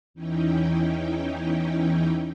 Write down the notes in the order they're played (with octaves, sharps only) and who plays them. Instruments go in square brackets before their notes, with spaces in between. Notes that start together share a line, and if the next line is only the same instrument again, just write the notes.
[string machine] E2 E3 C#4 D#4 E4 G5